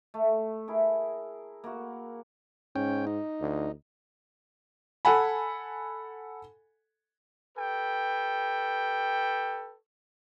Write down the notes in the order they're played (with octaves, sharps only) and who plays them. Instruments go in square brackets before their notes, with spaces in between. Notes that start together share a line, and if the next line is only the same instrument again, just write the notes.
[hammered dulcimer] A3
E4 G#4 A#4
A#3 F#4
[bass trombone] G#2 [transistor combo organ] C#4 G5
[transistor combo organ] D#4
[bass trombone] D2
[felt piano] A4 F#5 G#5 B5
[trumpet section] G4 A4 B4 G5